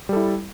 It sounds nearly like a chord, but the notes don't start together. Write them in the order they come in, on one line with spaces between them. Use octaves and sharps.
G3 A4 E4